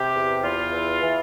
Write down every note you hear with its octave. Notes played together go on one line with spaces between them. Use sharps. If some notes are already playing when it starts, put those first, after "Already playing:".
Already playing: C3 G4
E2
E2 F4
E3
E3